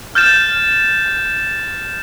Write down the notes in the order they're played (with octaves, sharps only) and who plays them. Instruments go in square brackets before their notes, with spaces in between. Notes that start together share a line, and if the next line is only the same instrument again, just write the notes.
[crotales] F6 G6 A6 E7